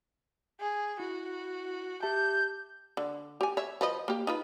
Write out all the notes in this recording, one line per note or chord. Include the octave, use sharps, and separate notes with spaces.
G#4
E4 F#4
G4 E5 A5 G6
D3
G4 G#5
C#5 E5
F3 B4 D#5
A#3 G4
D#4 F4 B4